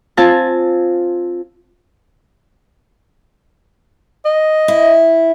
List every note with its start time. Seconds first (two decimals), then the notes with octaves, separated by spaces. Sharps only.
0.17 C4 F4 G#5 A5
4.25 D#5
4.68 E4